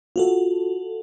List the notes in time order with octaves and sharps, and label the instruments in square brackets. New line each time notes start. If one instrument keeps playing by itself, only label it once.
[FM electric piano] F4 F#4 A4